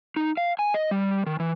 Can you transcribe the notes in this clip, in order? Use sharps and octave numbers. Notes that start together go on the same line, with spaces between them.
D#4
F5
G#5
D#5
G3
D#3
E3